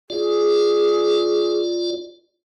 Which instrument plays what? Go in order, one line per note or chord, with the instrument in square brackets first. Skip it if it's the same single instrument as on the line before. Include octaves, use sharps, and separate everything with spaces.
[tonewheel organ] F4 D5 [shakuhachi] G#4